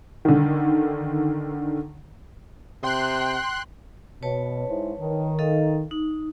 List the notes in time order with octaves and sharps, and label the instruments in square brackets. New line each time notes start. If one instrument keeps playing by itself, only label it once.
[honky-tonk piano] D3 D#3
[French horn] C3 [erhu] G5 [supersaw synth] C6 F#6
[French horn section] B2 [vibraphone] B4 C#5 A5
[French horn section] G#2 E4 C5
D#3
[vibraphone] A4 D#5 F5
D#4